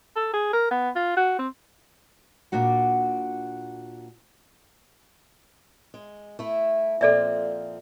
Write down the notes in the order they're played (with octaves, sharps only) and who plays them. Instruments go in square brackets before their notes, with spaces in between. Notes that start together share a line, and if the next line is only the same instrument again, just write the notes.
[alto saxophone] A4
G#4
A#4
B3
F4
F#4
C4
[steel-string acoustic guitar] A#2 D4 F#4 F#5
G#3
A3 E4
[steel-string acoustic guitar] A#2 F3 C4 [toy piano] A4 D5 E5